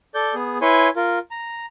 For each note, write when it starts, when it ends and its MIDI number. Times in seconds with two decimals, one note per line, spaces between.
0.15 0.34 69
0.15 0.34 74
0.15 0.34 91
0.34 0.58 59
0.34 0.58 68
0.61 0.89 64
0.61 0.89 71
0.61 0.89 73
0.61 0.89 80
0.61 0.89 84
0.61 0.89 85
0.96 1.19 65
0.96 1.19 70
1.31 1.66 82